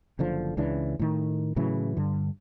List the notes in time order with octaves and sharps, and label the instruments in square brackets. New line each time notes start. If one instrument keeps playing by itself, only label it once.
[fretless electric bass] F#1 D3 F3
C#2 C#3 E3 D4
A2 D#3
A2 C#3 E3 F#3
G2 D3